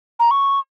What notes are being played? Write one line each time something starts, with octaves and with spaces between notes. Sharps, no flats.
A#5
C#6